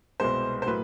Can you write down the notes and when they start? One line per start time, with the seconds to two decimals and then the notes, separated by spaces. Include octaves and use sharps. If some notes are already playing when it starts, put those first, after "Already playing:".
0.20 C2 B2 G#3 B3 C5
0.62 C5
0.66 A2 F#3 A#3 B4